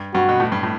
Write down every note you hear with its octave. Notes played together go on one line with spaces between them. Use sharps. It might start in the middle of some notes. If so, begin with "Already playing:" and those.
Already playing: G2
G2 F#4
B2
A2
G2
A2